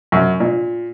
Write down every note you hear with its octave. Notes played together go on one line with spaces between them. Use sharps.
F#2
A#2